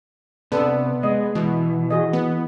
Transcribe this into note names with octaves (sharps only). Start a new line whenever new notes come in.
C3 B3 D4 A4
G#3 D#5
B2 E3
F#4 G#4 D#5
B3